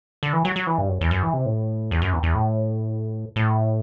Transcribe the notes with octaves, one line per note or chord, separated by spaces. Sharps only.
D3
E3
F#3
F#3
E3
G2
F#2
E2
F#2
E3
C3
A2
E2
F#2
E2
E2
A2
A2